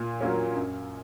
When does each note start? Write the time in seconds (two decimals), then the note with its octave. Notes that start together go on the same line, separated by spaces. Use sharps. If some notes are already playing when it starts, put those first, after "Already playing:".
Already playing: A#2
0.21 F#3 A#3 C#4
0.55 F#2